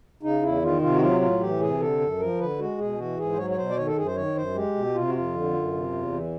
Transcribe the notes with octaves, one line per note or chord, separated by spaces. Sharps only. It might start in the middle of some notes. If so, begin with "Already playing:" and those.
C#3 D#4
E2 E4
D#3 F4
C3 F4
F#4
F#3 F4
A2 F4
E3 G4
C3 G#4
D3 A4
F#2
F3 A#4
D3 B4
G#3 F#4
B2 G#4
E3 F#4
G#2 G#4
C5
F#3 C#5
C#5
B2 C5
D5
D#3 C#5
A4
F#2 G#4
C5
D#3 C#5
F#2 C5
G#3 G4
B2
C3 F4
F#4
F2 F4
D3
F#2
C3
E2
E3